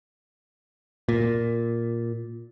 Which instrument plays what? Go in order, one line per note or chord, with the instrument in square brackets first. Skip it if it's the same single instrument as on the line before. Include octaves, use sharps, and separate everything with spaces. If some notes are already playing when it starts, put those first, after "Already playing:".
[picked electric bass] A#2